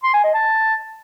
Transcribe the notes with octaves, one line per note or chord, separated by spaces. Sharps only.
C6
G#5
D#5
A5